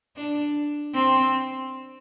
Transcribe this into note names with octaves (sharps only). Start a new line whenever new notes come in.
D4
C4